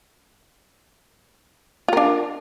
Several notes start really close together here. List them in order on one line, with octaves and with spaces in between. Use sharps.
F4 A#4 D4